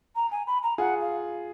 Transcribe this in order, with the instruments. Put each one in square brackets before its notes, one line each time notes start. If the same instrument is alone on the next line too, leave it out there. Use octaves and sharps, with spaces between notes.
[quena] A#5
G#5
B5
A#5
[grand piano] F4 G#4 [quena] F#5
[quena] F5